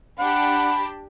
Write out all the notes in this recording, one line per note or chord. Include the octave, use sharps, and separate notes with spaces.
D4 G4 F#5 B5